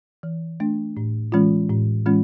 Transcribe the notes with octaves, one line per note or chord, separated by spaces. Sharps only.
E3
A3 D4
A2
E3 G#3 C#4 F4
A2
E3 G#3 C#4 F4